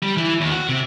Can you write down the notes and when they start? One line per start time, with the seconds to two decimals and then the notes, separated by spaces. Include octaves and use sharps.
0.03 G3
0.17 E3
0.41 D#2
0.52 F#4
0.69 C3